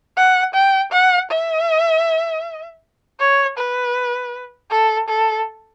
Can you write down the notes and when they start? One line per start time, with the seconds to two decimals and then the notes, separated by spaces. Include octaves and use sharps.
0.17 F#5
0.55 G5
0.92 F#5
1.31 E5
3.20 C#5
3.58 B4
4.71 A4
5.09 A4